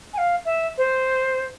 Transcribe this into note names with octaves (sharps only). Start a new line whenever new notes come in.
G#5
F5
E5
C5